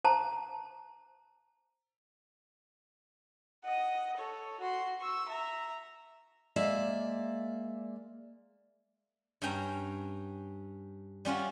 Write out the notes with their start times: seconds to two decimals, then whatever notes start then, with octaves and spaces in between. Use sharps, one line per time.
0.05 C5 A5 A#5
3.64 D#5 F#5
4.17 A4 C#5
4.60 F#4 C6
5.00 C#6 E6
5.29 E5 A#5
6.56 G#3 A#3 D5 E5
9.42 G2 C#4 G5 A#5
11.25 G3 C#4 F4 F#4